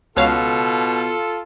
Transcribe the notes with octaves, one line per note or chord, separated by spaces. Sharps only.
C#2 B2 F4 A4 C#5 F5